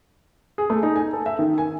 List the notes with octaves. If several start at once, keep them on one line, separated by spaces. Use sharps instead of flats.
G#4
A3
D#4
G#5
A4
E5
D#3
G#5